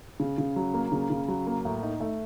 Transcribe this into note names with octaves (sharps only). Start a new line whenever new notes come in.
C#3
C#3
F#3
A#3
C#3
C#3
F#3
A#3
A2
D#4
A3